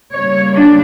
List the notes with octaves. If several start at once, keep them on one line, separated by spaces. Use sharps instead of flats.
C#3 G3 A#3 C#5
D4